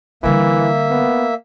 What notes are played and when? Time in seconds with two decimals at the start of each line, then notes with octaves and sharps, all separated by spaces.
0.23 D3 E3 G3 A#3 E5
0.90 B3